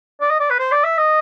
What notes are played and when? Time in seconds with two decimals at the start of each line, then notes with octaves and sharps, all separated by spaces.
0.21 D5
0.30 D#5
0.40 D5
0.50 B4
0.59 C5
0.71 D5
0.84 E5
0.97 D#5